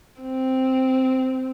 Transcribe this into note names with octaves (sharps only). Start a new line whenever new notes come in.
C4